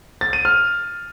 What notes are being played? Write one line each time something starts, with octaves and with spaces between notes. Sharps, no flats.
A6
D#7
F6